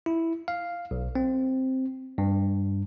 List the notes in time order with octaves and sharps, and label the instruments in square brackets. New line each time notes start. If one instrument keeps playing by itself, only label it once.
[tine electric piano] E4
F5
B1
C4
G2